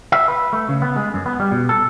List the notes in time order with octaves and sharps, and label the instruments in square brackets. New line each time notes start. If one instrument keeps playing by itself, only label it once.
[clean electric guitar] E5
B4
A3
C#3
B3
G#3
F#2
B3
G3
B2
A4